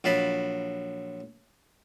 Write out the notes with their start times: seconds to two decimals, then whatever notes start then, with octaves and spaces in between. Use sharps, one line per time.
0.04 A#1 F#3 F5 A5 B5